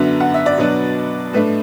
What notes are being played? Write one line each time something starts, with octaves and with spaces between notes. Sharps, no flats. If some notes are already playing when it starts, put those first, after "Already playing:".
Already playing: F#2 D3 B3 D4 E5
F#5
E5
D5
B2 F#3 B3 D4
A2 A3 D4 B4